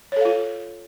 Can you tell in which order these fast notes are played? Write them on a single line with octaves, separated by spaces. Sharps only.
C#5 A4 F5 F4